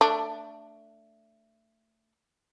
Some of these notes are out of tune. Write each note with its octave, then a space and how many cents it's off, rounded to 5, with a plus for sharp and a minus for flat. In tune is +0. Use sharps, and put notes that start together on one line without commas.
A3 +20 D4 +0